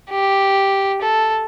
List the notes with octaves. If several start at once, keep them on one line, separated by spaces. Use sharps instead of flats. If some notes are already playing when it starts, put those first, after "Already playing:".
G4
A4